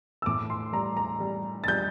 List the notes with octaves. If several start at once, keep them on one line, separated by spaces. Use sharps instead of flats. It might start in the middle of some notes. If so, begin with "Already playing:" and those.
E6
A2 D6
C6
G3 A#5
A#5
G3
A6
G3 G6